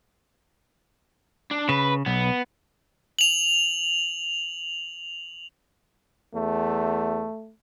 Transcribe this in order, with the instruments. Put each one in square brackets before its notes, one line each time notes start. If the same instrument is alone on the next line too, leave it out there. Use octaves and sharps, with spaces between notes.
[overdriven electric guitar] D4
[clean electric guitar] C#3 [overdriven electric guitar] B4
[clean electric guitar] B1 [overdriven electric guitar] B3
[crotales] F7 F#7
[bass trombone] E2 [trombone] A3